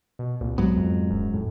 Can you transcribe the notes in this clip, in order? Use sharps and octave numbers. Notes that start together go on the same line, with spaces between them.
B2
C2 A#2
G#2 F#3 B3
F2
D#1 F#2
F2 A2